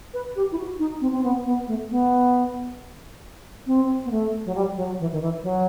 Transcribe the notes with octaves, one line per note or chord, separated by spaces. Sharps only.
B4
G4
E4
F#4
D#4
C4
C4
B3
B3
A3
B3
C4
B3
A3
F#3
G3
F#3
E3
D#3
E3
F#3